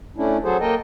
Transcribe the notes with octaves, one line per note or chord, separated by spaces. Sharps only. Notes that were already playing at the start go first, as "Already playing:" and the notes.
A3 C#4 D4 E4
F#3 F#4 G#4 A4 C5
A#3 A4 A#4 D#5 G5